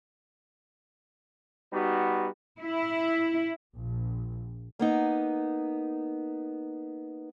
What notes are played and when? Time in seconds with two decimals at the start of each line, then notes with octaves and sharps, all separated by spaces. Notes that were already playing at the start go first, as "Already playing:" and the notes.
1.72 G3 B3 D#4 F#4
2.60 E4
3.75 A#1
4.79 A#3 B3 D#4